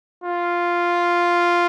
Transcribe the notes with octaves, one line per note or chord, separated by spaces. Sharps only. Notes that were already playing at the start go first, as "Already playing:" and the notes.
F4